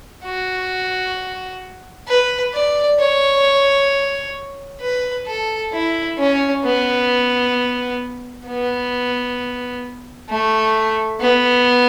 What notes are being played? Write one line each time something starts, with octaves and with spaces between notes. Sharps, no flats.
F#4
B4
D5
C#5
B4
A4
E4
C#4
B3
B3
A3
B3